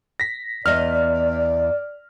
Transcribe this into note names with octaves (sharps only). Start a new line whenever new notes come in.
A#6 B6
E2 D5 D#5 F6